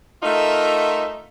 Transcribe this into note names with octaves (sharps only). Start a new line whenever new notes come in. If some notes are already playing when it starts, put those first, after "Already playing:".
A3 D#4 F4 A#4 E5